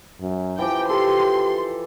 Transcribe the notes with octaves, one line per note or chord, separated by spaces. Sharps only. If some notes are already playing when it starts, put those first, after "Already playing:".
F#2
E3 F3 G4 G5
G4 A4 C6